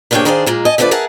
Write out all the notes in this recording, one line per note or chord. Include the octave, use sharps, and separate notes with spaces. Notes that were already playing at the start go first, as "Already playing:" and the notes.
C3 A#3 D4 G#4 C#5 G5
D#3 D4 G#4 C5 D5 F5
A#2 G#3 A#3
D#5 G#5 A5
D3 F3 A3 C4 B4 D5
G#4 A#4 E5 F#5 A5